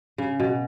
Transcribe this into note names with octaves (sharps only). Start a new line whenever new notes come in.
C#3
B2